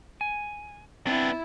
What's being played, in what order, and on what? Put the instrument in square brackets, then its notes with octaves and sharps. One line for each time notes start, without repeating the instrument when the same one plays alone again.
[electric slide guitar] G#5
[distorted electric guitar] B3 D4 [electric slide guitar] C4 [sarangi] E4